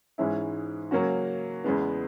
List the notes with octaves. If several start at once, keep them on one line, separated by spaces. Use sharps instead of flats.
G#2 E3 G#3 C#4 E4
C#3 F#3 A#3 C#4 F#4
E2 C#3 G#3 B3